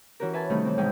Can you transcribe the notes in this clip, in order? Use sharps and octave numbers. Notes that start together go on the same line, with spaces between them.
E3 C#4 F#4 G4 A#4
B4 E5 G#5 A5
C3 D#3 G3 A3 C#4
E3 C4
G#2 B2 D#3 G5